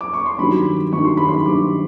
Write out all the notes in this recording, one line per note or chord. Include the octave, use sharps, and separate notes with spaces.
D6
C#6
C6
G2 D#3 F#3 B5
G2 D#3 F#3 C#6
C6
B5
C6
G2 D#3 F#3 D6